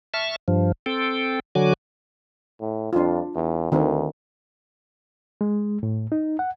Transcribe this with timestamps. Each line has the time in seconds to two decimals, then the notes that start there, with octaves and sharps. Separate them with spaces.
0.14 E5 A5 C#6 F6
0.48 G2 F3
0.86 C4 A4 G5
1.55 D3 F#3 F#4 G#5 D6
2.61 A2
2.93 F2 D4 F4
3.35 E2
3.72 D2 D#3 C4
5.41 G#3
5.83 A2
6.12 D#4
6.39 F#5